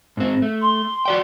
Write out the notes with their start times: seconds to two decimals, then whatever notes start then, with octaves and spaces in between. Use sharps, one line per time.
0.17 G#2 C4
0.42 A3
0.62 C6
1.06 F#4 D5 G5